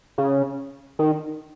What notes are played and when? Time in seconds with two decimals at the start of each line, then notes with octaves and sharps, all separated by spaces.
0.18 C#3
0.99 D#3